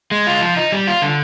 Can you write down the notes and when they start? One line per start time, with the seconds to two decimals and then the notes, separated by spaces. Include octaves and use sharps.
0.11 G#3
0.27 F4
0.41 F3
0.57 D#4
0.72 G3
0.87 F4
1.02 D3